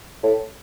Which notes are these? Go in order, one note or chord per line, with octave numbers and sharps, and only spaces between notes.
A2